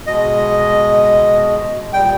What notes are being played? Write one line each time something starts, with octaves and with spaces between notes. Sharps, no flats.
B2 G#3 D#5
A#2 G3 G5